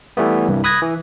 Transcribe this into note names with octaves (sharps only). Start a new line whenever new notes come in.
E3 G3 A3 B3
C2 G2
B5 D#6 F#6 G#6 A#6
E3